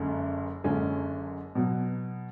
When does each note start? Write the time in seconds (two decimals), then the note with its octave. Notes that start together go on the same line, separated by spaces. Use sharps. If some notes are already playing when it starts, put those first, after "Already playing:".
Already playing: F#1 F#2 D3 G#3 C#4
0.64 F#1 F#2 D3 G#3 C#4
1.55 B2 F#3 B3